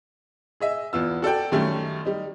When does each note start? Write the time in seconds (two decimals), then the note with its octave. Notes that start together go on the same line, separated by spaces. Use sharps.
0.60 G#4 D#5 E5
0.93 E2 B3 F4 E6
1.22 F#4 A4 D5 G5
1.52 F#2 D#3 G3 A3 C#4
2.05 G3 D#4